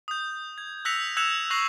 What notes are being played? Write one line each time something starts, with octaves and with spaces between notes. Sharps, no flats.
D#6 G6
G#6
E6 F#6 A#6 B6 C#7 F7
E6 F#6 G#6 C#7 E7 F7
C#6 F#6 A#6 C7 F7 F#7